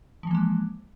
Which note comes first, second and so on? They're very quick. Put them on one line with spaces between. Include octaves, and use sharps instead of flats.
F3 E3 A#3 G#3